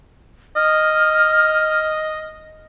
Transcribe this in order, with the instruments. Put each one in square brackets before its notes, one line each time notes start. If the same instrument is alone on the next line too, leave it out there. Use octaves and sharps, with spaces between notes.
[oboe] D#5 [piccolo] F6